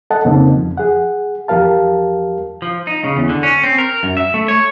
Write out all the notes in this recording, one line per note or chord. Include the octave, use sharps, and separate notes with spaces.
A4 D#5 F#5 A5
F2 C#3 A#3 C4 D#4
F2 F3
G#4 F#5
E2 F3 G4 A#4 F5 A5
F3
D#4
C#3
E2
D3
C#4
C4
A#4
F#2
E5
A3
C#5